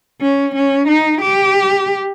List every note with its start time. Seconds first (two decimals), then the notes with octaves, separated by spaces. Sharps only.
0.22 C#4
0.55 C#4
0.88 D#4
1.22 G4